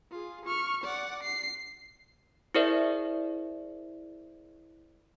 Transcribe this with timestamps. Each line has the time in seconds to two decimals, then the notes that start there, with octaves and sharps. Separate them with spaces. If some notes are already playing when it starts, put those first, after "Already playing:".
0.11 F4 G#4
0.45 C#6 F6
0.84 D5 F#5
1.23 C7
2.55 E4 G#4 A#4 C5 D5 E5